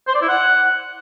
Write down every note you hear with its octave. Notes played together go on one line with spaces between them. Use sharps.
C5
D5
E4
F#5